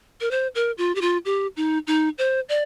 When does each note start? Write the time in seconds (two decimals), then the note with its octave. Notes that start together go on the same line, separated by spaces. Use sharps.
0.21 A#4
0.31 C5
0.55 A#4
0.78 F4
0.95 G4
1.01 F4
1.25 G4
1.57 D#4
1.87 D#4
2.18 C5
2.49 D5